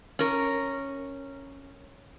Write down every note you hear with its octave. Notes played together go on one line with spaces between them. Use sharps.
C#4 A#4